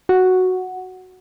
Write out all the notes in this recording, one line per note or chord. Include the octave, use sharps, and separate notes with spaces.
F#4